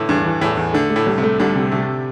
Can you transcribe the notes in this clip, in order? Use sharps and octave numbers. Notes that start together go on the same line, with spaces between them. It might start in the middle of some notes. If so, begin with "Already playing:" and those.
Already playing: A2 D3 E3
E2 G2
E3
E2 A2
E2
D3 A3
A3
A2
C2
C3
A3
C2 D3
C3
C3 A3